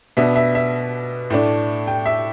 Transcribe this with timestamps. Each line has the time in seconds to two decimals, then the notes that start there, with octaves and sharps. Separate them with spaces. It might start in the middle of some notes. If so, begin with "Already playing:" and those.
0.17 B2 B3 D4 E5
0.36 E5
0.55 E5
1.30 A2 A3 D4
1.87 G5
2.06 E5